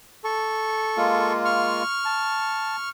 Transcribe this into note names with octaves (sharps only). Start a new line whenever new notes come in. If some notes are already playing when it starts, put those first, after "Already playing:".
A4 C#6
G#3 A#3 F4
C#6 F6
A5